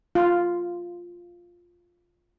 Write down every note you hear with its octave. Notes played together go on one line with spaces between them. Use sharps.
F4